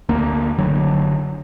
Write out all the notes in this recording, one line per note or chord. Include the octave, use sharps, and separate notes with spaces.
D2 A#3
F#1 D3 F#3